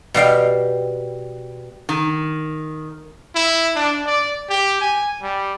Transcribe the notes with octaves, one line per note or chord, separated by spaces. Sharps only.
B2 G3 F5 G5
D#3
E4
D4
D5
G4
G#5
G3